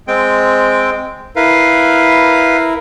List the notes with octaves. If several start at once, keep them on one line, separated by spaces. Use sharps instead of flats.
G#3 C4 G5
E4 A#4 B4 F5